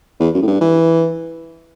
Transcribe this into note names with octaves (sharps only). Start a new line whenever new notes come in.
E2
F#2
A2
G2
E3